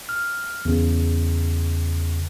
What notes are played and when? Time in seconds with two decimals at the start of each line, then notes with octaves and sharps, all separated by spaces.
0.09 F6
0.65 E2 C#3